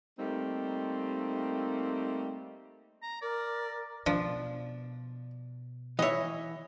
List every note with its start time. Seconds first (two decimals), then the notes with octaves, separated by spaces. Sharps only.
0.18 G3 A3 A#3 C4 D#4
3.03 A#5
3.22 A#4 D5
4.06 B2 F3 D4
5.99 E3 C#5 D#5 E5